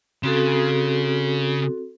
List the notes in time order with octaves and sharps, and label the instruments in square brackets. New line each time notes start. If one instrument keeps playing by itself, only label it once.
[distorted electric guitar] C#3 [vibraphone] C4 F#4 A4